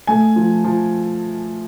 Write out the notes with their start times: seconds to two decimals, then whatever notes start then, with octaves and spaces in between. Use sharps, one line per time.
0.07 A3 G#5
0.36 F3
0.64 F3